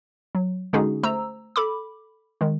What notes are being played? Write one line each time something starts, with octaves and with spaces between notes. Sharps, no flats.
F#3
D3 G#3 C#4 D#4 F#4 G#4
A3 C5 A#5 E6
A4 B5 D6
D#3 G#3